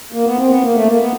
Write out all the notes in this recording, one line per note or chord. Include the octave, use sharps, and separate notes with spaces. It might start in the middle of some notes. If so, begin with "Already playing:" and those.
A#3
B3
C4
B3
A#3
A3
A#3
B3